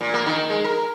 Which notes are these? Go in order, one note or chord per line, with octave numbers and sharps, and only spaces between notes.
A#2
A#3
D#3
G#3
A#4